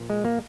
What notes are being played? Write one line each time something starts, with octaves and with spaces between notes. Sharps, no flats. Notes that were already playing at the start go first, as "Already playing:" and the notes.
Already playing: A#2 F3
G#3
A#3